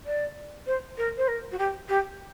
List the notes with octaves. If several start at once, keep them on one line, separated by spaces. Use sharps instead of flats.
D5
C5
A#4
C5
A#4
F#4
G4
G4